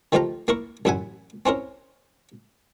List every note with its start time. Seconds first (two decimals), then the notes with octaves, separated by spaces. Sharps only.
0.12 D#3 F3 A3 G4 F5 A#5
0.48 A#3 E4 A#4 C#6
0.85 A1 F#2 E4 E5 F#5 G#5
1.46 C4 C#4 E4 A#4